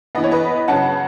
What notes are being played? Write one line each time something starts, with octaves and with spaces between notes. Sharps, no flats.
E3 B3 D#5
C#5
B4 D#5
C#3 F#3 C#4 F#5 A5